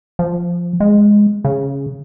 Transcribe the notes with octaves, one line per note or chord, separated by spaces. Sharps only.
F3
G#3
C#3